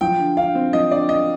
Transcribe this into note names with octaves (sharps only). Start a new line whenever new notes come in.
F3 G5
D3
D3 F5
C4
F3 D#5
D3 D5
D3 D#5